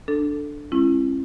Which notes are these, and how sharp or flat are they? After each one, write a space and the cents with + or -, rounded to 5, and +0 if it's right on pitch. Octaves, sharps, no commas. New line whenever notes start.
D4 +0 A4 +0
G#3 +5 C#4 -40 E4 +35